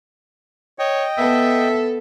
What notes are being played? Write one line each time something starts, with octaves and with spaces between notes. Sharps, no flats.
C#5 D#5 G5
B3 A4 E5